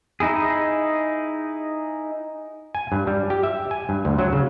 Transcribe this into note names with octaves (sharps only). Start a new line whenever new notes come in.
D#4 E4 G#4
G#5
G2
G3
G4
E5
G#5
G2
D2
F#3
C#3